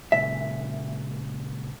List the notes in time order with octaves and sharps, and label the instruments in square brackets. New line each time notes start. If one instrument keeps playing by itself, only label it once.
[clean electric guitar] A#2 C#3 G#3 [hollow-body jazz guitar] E5